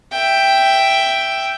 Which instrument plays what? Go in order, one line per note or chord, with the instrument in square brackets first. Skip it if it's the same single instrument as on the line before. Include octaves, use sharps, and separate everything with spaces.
[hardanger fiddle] E5 G5